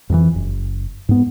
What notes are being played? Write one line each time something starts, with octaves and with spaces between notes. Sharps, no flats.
F2 D#3 E3
F#1
G#2 B3